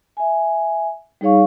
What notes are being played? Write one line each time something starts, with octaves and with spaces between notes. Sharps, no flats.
E5 G#5
G3 D#4 G#4 C#5 F5 C#6